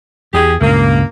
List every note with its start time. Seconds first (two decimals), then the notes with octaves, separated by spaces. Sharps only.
0.34 E2 G4 G#4
0.61 C#2 G2 A#2 A#3